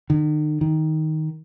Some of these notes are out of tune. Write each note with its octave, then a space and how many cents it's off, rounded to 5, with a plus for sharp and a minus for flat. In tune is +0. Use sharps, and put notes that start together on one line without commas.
D#3 -40
D#3 +10